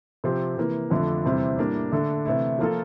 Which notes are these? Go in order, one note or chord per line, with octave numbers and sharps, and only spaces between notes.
C3 F3 C4 G4
C3 E3 A#3
F2 D3 F3 A3 D4
E2 C3 G3 C4 E4
A2 G3 A#3 D4
D3 A3 D4 A4
C3 E3 A3 E4
F3 A#3 F4 A4